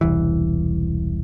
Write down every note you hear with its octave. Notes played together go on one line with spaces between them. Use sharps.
E1 C2 E3